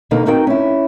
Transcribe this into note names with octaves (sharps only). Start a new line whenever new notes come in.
B2 D3 D#3 A#3 D#4
C4 D#4 F#4 A#4 G5
C#4 E4